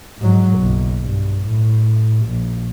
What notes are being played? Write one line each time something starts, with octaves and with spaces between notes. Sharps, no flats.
G#2 F#3
F#1 B1
G2
A2
A#1